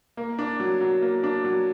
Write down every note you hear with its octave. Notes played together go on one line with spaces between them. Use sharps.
A#3
D4
F#3
F#3
A#3
D4
F#3